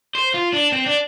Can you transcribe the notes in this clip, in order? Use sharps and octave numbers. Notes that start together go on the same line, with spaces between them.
C5
F4
D4
C4
D4